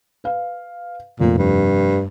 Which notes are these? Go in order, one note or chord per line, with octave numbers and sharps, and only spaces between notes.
B4 F5
F1 F2 A#2
G2